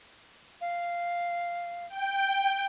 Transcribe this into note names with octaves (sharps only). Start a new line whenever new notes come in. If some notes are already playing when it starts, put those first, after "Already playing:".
F5
G5